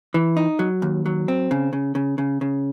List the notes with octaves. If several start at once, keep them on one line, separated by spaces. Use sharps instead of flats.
E3
D#4
F#3
D#2
F#3
C4
C#3
C#3
C#3
C#3
C#3